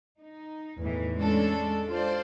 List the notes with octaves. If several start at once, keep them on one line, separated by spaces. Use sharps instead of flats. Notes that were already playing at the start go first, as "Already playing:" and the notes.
D#4
E2 A2 E3
G#3 C#4 D4 A4
F4 C5 D5 C6